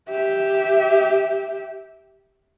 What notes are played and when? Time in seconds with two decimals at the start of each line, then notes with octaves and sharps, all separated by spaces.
0.10 G4 E5